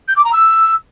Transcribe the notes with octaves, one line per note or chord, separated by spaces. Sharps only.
G6
D6
A#5
E6